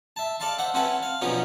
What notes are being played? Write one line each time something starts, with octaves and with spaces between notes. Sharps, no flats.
E5 A5
A4 D5 F5 A5 C6
C5 E5 F#5
C4 C#4 E4 F#4 A4 B4
F5
B2 D3 F3 F#3 C#4 D#4